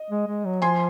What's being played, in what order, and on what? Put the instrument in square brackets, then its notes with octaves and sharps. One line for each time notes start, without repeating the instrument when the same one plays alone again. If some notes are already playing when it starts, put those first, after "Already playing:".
Already playing: [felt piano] D#5
[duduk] G#3
G#3
F#3
[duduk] F3 [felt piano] G#5 C6